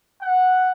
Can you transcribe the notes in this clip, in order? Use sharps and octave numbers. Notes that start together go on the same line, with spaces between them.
F#5